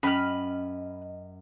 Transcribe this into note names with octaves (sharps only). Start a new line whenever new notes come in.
F#2 C#4 D#5 B5 F6